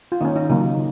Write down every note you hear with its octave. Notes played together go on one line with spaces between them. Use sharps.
F4
D#3 A#3 C#4 D#4
D#4
C#3 F#3 A#3 D#4